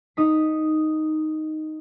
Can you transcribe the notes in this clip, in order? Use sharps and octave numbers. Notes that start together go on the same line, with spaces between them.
D#4 D#6 B6